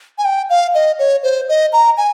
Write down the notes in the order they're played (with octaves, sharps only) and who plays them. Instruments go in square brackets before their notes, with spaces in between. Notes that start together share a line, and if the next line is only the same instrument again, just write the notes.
[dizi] G#5
G5
F5
D#5
C#5
C5
D#5
A#5
G#5